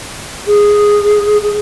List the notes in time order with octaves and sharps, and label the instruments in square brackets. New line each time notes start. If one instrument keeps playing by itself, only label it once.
[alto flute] G#4